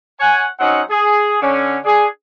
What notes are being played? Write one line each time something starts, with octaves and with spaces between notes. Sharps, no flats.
C#5 F#5 G#5
F#3 C4 C#4 D#4 F#5
G#4
D3 C#4
D4 G#4